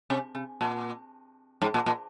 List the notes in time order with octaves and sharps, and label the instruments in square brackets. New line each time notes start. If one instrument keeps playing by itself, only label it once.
[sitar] C3
C3
A#2
G#2
A#2
A#2